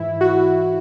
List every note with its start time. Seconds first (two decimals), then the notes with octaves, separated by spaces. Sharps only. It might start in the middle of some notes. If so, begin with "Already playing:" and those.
Already playing: G#2 E3 E4
0.21 F#4